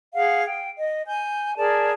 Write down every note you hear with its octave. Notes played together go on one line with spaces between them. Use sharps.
G#4 F5 F#5
G5
D#5
G#5 G6
G#4 A#4 D5 A5